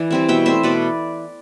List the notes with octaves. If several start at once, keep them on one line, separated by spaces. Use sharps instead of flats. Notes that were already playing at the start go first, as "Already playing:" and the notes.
Already playing: E3 D5
G3 C4 E4
B2 E5 G5
A3 C4 C5 E5
B2 B4 D5